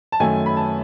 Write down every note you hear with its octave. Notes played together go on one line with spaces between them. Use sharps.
A5
F#2 D#3 A3 G#5
B5
A5